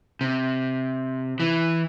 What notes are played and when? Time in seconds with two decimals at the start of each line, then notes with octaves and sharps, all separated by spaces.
0.21 C3
1.40 E3